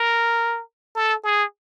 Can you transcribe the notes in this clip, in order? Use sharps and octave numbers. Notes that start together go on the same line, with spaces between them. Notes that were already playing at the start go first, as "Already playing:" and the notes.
Already playing: A#4
A4
G#4